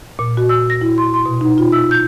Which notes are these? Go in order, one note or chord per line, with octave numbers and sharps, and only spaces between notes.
A#2
F#4
E6
A#6
E4
C6
C6
B2
D#4
F4
E6
G6